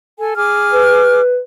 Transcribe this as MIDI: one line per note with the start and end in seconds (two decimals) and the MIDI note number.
0.19 0.33 69
0.19 0.33 80
0.36 1.21 68
0.36 1.21 86
0.36 1.21 89
0.72 1.38 71